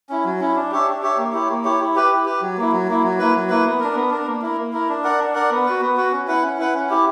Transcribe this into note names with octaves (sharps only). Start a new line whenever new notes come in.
C#4 E4
F#3
C#4 E4
D4
G4 C#5 E5
D4
G4 C#5 E5
A#3
E4 G4 C#5
A#3
E4 G4 C#5
E4
G4 B4
E4
G4 B4
F#3
A#3 E4
F#3
A#3 E4
F#3
A#3 E4 B4
F#3
A#3 E4 B4
B3
D4 A#4
B3
D4 A#4
A#3
E4 A#4
A#3
E4 A#4
D4
A#4 D5 F#5
D4
A#4 D5 F#5
B3
F#4 B4
B3
F#4 B4
C#4
E4 B4 F#5
C#4
E4 B4 F#5
C#4
E4 G4